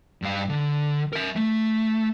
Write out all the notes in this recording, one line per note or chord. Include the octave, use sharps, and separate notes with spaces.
G2 F5
D3
A#4 E5
A3